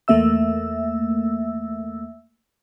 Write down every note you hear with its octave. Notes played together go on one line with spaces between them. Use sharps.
E2 A3 A#3 E5 E6